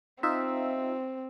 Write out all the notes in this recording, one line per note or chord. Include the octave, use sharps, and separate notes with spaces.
C4 D#4 F4 E5